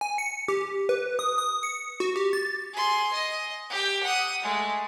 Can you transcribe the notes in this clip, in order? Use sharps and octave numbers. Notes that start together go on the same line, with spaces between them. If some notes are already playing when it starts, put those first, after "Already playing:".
G#5
C#7
G4
B4
D#6
D#6
C#7
F#4
G4
A6
G#4 C6
D#5
G4 G5
F#5 D#6
G#3 A3